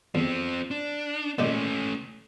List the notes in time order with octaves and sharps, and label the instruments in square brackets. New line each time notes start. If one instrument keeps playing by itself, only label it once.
[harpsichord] E2 [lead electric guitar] F3 C4
[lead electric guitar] D4
[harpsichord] A#2 G#3 G4 [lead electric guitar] A3 C#4